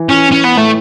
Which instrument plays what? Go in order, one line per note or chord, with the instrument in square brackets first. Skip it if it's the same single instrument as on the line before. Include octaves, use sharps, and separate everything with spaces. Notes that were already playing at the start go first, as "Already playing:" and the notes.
Already playing: [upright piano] E3
[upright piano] E3 [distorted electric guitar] C#4
[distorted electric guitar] C#4
B3
[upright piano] A2 [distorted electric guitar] A3